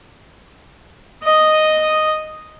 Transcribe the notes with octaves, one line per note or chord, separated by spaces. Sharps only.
D#5 D#6